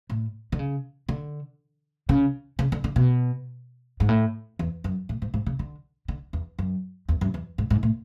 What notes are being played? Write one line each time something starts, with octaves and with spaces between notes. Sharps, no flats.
A2
D3
C#3
D3
C#3
C#3
D3
D3
B2
G#2
A2
E2
F#2
A2
G#2
G#2
C#3
D3
D3
E2
F#2
E2
F#2
E2
G#2
G#2
A2